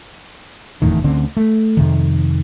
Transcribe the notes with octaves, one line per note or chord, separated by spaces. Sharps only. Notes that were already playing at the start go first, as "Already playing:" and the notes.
F1 E2 A2 D#3
D2 D3 C4 C#4
A3
F2 C3 D#3